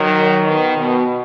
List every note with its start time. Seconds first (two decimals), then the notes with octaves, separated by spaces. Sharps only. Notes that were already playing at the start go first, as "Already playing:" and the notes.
Already playing: D#3 F#3
0.46 B2 D#3
0.77 B2